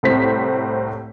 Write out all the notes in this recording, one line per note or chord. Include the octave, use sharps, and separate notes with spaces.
C2 A2 C4 B6